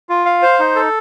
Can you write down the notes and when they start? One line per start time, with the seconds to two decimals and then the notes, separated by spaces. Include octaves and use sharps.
0.09 F4
0.26 F5
0.42 C5
0.59 D#4
0.76 A4